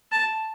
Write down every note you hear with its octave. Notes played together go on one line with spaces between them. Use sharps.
A5